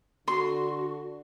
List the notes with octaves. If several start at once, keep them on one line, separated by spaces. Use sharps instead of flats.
D3 F#4 C6